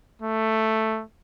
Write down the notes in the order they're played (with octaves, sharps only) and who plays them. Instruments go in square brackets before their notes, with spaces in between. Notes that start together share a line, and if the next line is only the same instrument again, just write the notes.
[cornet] A3